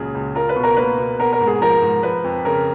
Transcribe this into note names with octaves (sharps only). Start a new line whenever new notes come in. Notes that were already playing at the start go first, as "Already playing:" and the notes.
Already playing: C#2 A#2 C#3 F#3 G#4
C#2
F4 A#4
B4
B2
A#4
A#3 B4
B2
B3 A#4
A#4
G#2
G#4
F3 A#4
G#2
F3 B4
F2
C#3 A#4